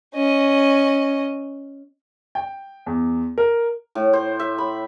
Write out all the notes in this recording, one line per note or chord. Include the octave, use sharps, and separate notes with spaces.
C#4 D#5
G5
E2
A#4
A2
C5
E5
B5